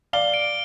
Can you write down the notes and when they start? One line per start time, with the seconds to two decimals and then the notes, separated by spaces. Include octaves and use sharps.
0.13 D5 F5 G7
0.34 D7